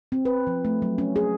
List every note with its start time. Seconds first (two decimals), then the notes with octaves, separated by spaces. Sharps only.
0.12 C4
0.25 B4
0.47 F3
0.65 A3
0.82 F#3
0.98 C#4
1.16 G#4